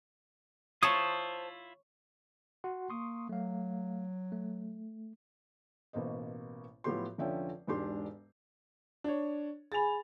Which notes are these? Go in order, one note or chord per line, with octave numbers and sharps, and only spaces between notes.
E4 F4 C5 C#5 A5 D#6
F#4 F#5 C6
A#3 C6 C#6 D#6
F#3 A3 F5
A3
A1 B2 A#3 C5 D#5
A2 F3 F#3 B3 G4 C6
F1 D3 F3 C#4 E5 G5
E1 G#2 D4 G4 C6
D4 C#5
G#4 G#5 B5 A6 F7